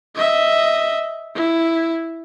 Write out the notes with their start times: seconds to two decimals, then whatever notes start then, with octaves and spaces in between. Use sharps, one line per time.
0.15 D#5 E5
1.35 E4